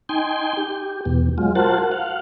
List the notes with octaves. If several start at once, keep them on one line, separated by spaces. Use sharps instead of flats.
D#4 G5 G#5 C6
G4
E2 B2
F#3 G#3 F4
F4 F#4 A#4 C5 F#5 A5
F5 F#5